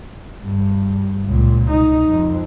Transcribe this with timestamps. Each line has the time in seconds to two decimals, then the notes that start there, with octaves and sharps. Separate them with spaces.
0.42 G2
1.26 C#2 A#2
1.71 D#4
2.08 F2